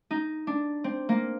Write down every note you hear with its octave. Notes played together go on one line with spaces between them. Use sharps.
D#4
D4
C4
A#3